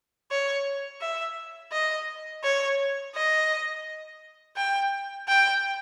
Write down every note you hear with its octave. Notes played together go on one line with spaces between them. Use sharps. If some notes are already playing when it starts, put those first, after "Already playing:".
C#5
E5
D#5
C#5
D#5
G5
G5